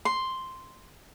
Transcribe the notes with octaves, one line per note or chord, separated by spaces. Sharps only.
C6